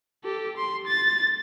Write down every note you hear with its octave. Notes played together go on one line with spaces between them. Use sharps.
G4 A4
C6
A6